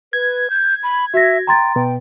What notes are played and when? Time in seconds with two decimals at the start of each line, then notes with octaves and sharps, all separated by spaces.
0.13 B4 G#6
0.50 G6
0.83 B5
1.14 F#4 E5 A#6
1.47 G5 A#5 C6 A6
1.76 B2 G5